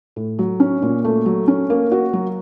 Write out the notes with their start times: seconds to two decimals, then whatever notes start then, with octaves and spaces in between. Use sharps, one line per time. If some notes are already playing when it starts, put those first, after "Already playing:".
0.16 A2
0.39 F#3
0.60 C#4
0.82 A#2
1.04 A3
1.26 F#3
1.48 C#4
1.70 A#3
1.91 F#4
2.13 F#3